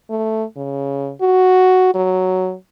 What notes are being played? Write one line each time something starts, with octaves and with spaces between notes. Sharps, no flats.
A3
C#3
F#4
F#3